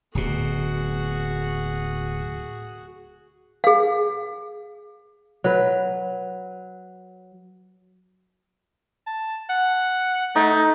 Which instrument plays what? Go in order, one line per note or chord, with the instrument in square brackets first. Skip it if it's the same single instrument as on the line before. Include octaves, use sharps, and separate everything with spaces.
[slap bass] D1 B2 [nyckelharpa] F#4 G#4
[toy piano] G#4 F5
[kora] F#3 B4
[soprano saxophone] A5
F#5
[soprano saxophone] A3 [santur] D#4